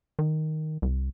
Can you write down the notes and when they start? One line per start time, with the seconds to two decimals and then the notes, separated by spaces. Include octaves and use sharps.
0.19 D#3
0.82 C2